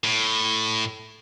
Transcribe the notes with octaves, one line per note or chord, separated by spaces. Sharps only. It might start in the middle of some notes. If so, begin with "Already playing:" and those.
A2